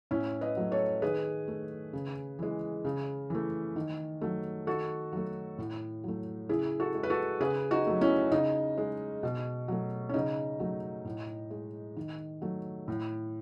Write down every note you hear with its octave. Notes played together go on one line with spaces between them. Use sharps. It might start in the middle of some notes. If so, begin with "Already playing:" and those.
A2 C#4 E4
B4 D#5
F#3 A3
A4 C#5
D#3 G#4 B4
A3
C#3
E3 G#3
C#3
E3 A3
D#3
F#3 A3
D#3 F#4 A4
F#3 A3
A2
F#3 A3
C#3 E4 G#4
F#4 A4
G#3
B4
F#4 A4
C#3 G#4 B4
D#4 F#4
F#3 A3
C#4 E4
C#3 D#4
G#3
B2
F#3 A3
C#4
C#3 D#4
F#3 A3
A2
G#3
D#3
F#3 A3
A2